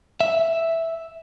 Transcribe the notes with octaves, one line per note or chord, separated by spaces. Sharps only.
E5